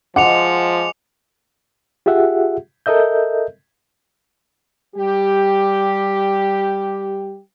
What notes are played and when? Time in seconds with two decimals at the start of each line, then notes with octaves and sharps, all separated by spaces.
0.16 F3 G#3 F#5 D6 C#7 F7
2.06 F4 G4 G#4 E5 F#5
2.86 A4 A#4 D#5 E5 G6
4.96 G3 G4